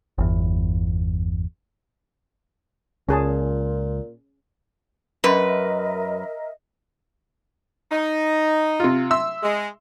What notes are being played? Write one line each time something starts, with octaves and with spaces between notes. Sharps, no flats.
G1 E2
C#2 A#2 C#4 G#4 A5
F#2 A#4 B4 D#5 E5
D#4
C3 F4
E5 C6 E6
G#3